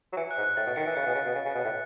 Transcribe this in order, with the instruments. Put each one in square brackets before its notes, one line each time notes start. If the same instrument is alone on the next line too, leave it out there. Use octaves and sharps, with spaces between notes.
[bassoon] F#3
[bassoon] E3 [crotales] C#7
[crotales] F#6
[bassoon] G#2
[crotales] F#6
[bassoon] A2 [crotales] A6
[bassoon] B2
[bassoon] D#3 [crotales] C#7
[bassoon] E3
[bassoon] C#3 [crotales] C#7
[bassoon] B2
C#3
B2
C#3
C#3
B2
A2